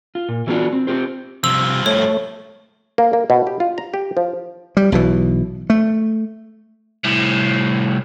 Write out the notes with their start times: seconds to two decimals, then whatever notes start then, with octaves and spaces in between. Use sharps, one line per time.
0.15 F4
0.29 A#2
0.47 E3 F#3 B3 D4 F4 F#4
0.73 C4
0.87 C4 F4 G4 C5
1.44 G2 C3 F3 E6
1.86 A3 C#5
2.98 A#3
3.13 A#3
3.30 B2
3.47 G4
3.60 F4
3.78 A#5
3.94 G4
4.17 F3
4.77 G3
4.92 B1 B2 E3
5.70 A3
7.04 C2 A2